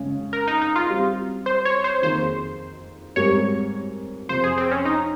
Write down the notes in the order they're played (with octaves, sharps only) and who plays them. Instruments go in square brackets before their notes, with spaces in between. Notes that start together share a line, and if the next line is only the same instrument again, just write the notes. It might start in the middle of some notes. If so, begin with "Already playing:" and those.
Already playing: [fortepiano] C#3 G#3 C#4 G#4
[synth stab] A#4
D#4
D#4
F4
[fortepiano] G3 C4 G4
[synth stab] C5
C#5
C5
[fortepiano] F2 D#3 A#3 D#4 G#4 [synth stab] C5
[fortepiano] G#2 G3 C4 G4 A#4 [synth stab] C#5
[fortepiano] F2 C3 F3 [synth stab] C5
[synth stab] G#4
C4
C#4
D#4